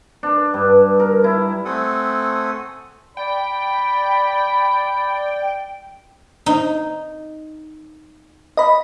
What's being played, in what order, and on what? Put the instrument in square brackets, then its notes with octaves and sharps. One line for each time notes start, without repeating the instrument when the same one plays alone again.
[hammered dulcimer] D4
G2
A#4
E4
[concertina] A3 C4 A4 F#5 G#5 D#6
[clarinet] D5 [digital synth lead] G5 [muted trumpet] B5
[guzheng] D#4
[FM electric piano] D#5 B5